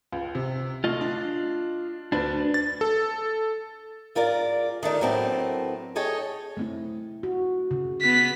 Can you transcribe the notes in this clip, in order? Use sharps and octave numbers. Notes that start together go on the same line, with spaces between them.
C#2
C3
A3 F4 D#5
D4
D2 D4 B4
A6
A4
G#2 F4 A#4 D5 F5
D#3 A3 D4 D#4
A2 F#3 B3 C4 A#4 A5
G#4 A4 C#5 D#5 G5
A3 C4 E4
F#4
C#3
B3 B6